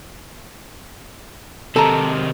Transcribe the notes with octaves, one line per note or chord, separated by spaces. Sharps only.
C3 D#3 A4 A#5